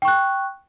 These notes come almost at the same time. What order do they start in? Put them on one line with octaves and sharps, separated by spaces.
G5 C#6 F#6